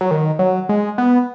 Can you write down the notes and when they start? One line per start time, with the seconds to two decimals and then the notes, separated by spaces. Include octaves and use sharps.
0.01 F#3
0.11 D#3
0.39 F#3
0.69 G#3
0.98 B3